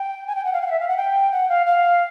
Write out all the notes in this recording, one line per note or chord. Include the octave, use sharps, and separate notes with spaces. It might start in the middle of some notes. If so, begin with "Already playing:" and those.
Already playing: G5
G#5
G5
F#5
F5
F#5
F5
E5
F5
F#5
G5
F#5
F5
F5